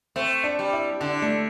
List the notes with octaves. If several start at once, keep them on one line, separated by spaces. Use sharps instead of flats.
A3 C4
D4
G3
E4
D3 D4
A3